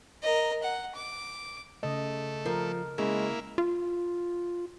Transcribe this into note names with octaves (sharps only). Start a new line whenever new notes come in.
A#4 D#5
F#5
D6
C#3 A3 D#5
F3 A#4
C#3 G#3 A#3 E4
F4